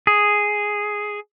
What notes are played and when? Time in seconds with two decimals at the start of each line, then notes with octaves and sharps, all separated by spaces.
0.07 G#4